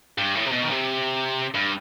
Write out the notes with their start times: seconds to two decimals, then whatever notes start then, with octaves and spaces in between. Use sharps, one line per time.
0.18 G2
0.35 A2
0.46 C3
0.52 B2
0.63 D#3
0.69 C3
1.54 G2